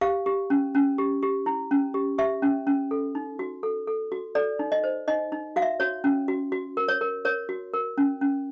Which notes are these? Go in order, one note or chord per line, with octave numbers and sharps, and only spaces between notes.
G4 F5
G4
C#4
C#4
G4
G4
E4
C#4
G4
G4 E5
C#4
C#4
A4
D#4
F#4
A4
A4
F#4
A4 D5
D#4
D#5
C5
D#4 D#5
D#4
F#4 F5
E5
F#4 C#5
C#4
F#4
F#4
A#4
C#5
A#4
A#4 C#5
F#4
A#4
C#4
C#4